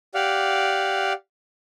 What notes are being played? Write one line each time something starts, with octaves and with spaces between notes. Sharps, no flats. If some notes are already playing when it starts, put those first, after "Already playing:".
G4 D5 F5 F#5